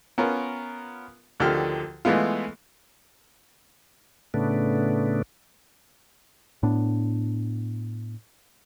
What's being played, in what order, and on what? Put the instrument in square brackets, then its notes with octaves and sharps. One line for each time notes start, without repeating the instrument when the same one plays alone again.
[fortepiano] B3 C#4 F4 A#4
D2 D3 D#3 F3 G4 F6
E3 G#3 A3 B3 F4
[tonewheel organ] A2 C#3 A3 B3 D4
[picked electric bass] A2 B3 D4